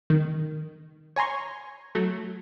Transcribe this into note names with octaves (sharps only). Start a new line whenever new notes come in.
D#3
C#5 G#5 A#5 C6 C#6
F#3 A3